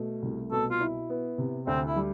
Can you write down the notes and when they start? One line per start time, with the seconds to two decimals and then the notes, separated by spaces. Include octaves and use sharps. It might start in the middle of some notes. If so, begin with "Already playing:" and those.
Already playing: B2 A3
0.22 C2
0.51 B2 A4
0.71 F4
0.80 E4
1.10 B3
1.38 C3
1.67 D2 C4
1.86 E4
1.96 G3